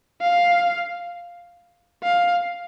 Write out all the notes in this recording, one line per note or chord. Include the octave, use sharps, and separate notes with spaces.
F5
F5